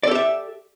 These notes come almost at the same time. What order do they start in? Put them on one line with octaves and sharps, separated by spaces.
D5 A4 G4 E5